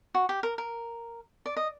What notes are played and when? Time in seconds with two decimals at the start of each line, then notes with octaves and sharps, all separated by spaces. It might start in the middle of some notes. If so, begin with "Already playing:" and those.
0.15 F#4
0.29 G4
0.43 A#4
0.58 A#4
1.46 D5
1.57 D#5